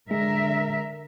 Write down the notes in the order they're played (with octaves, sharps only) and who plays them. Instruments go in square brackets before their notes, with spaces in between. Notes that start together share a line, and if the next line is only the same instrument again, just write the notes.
[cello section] D3 A#4 E5 [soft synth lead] G#3